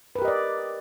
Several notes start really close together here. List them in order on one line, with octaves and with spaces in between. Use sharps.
B4 A#4 G4 D#5 D5